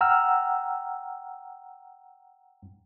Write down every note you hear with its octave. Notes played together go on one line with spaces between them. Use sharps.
F#5 G5 A#5 E6 F6